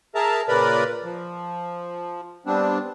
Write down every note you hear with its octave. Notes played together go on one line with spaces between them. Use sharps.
G#4 A#4 E5 A5 A#5
A#2 C#3 A#4 B4 D5 B5
F3
G3 B3 C4 D4